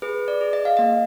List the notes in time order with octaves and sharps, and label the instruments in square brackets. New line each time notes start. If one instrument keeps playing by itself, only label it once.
[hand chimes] G#4 B4
D5
G#4
D#5
F5
A#3 D#5